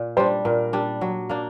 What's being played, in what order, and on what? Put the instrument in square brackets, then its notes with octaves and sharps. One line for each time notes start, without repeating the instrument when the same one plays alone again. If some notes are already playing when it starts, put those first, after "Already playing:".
Already playing: [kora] A#2
[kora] G3 D4 [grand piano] C5
[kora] A#2 [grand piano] A#4
[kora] G3 D4
F#3
A#3 D4